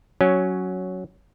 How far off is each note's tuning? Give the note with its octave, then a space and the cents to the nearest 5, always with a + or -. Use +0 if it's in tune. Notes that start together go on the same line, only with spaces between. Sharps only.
F#3 +0 C#4 +0